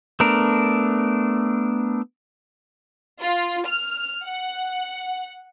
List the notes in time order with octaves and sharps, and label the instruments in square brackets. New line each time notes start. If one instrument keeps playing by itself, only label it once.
[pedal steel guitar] A3 B3 D4 A#4
[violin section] F4
F6
F#5